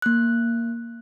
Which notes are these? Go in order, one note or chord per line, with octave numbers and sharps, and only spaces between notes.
A#3 F#6